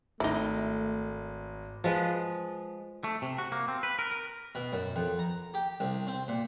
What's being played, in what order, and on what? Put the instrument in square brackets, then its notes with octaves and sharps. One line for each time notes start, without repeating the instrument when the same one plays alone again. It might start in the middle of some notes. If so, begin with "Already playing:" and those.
[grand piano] G#1 [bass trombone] A3 [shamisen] D#4 E4
[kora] F3 G#3 B4
[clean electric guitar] A3
C3
F#4
A#3
C4
B4
A#4
A#4
[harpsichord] B2
F#2
F2
A#5
G4
C2
C4
A#2